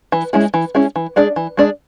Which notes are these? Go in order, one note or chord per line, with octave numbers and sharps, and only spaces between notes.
E3
G#3 C#4 E4 G#4
E3
G#3 C#4 E4 G#4
E3
G#3 D4 G#4 D5
E3
G#3 D4 G#4 D5